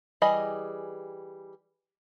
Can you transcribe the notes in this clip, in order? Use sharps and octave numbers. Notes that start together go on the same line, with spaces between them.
E3 G3 G#4 D#5 B5